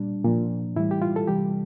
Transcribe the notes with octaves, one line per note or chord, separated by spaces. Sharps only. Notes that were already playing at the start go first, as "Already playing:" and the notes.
Already playing: A#2 G3 D4
A#2 F3
A2 E3 G3 E4
G4
F4
A4
C3 E3 G3 G4